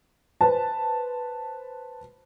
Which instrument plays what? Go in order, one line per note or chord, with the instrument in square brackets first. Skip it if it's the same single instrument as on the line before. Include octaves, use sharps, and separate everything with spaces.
[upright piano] B4 C5 A5